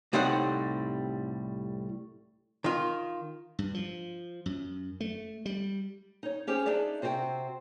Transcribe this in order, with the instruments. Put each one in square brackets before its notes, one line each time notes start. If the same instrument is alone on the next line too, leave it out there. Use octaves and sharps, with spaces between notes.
[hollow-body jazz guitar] C2 A2 G3 C4 D#4 F#5
D#3 F4
[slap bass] G2
F3
F#2
A3
G3
[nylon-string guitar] D#4 C#5
C#4 G4 G#4 C5
D4 D#4 G#4 D5 E5
C3 C4 F#4 D#5 G5